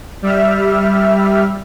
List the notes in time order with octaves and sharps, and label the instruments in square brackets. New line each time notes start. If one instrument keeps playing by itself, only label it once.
[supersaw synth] G3 E5 F6